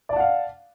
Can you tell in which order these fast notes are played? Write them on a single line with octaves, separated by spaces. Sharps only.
D5 A5 F#5 F5